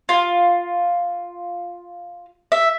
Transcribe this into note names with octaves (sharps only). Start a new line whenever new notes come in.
F4
E5